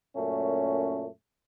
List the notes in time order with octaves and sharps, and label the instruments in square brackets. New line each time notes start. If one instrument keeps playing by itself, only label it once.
[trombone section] F#2 A#2 A3 C#4